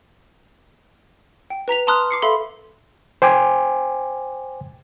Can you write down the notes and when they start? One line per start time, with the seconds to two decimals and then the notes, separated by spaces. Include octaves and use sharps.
1.50 G5
1.68 B4 A#5 B6 F7
1.87 A5 A#5 C6 D#6 F6 F#6
2.11 D6 C7 C#7
2.22 A4 E5 F5 B5 C6
3.22 C5 G5 G#5 D6